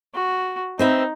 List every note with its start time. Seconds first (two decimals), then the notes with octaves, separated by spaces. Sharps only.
0.15 F#4
0.79 C4 D#4 B4 E5